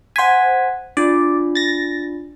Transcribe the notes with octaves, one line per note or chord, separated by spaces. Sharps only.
C5 F#5 G#5 B6
D4 F4 D5
A6 A#6